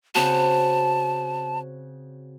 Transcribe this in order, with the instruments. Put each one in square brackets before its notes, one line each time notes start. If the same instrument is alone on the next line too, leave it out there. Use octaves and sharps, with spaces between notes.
[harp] C#3 C4 F#4 [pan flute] A5